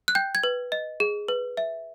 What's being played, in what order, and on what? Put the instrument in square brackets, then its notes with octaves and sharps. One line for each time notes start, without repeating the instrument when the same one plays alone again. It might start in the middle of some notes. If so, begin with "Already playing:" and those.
[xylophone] F#6
G5 G6
G#6
B4
D#5
G#4
B4
E5